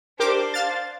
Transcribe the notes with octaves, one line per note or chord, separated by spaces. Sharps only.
D4 G4 A#4 C5 D6
F5 A6